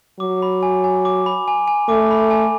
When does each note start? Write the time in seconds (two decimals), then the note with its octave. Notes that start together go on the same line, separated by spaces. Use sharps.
0.20 F#3 D6
0.42 B5
0.63 G#5
0.84 G#5
1.05 D6
1.26 B5
1.48 G#5
1.68 G#5
1.89 A3 D6
2.11 B5
2.31 G#5